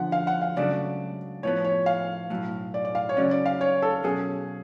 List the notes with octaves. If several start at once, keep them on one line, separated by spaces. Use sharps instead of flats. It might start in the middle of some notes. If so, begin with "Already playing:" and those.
Already playing: D3 F3 B3 F#5
F5
F#5
F5
C#2 C#3 F#3 A3 D4 D5
A2 F3 B3 C#5
C#5
F5
B1 A2 F#3
D5
D5
F5
C#5
C#3 F#3 C#4 D5
D5
F5
C#5
A4
B2 F#3 C#4 G#4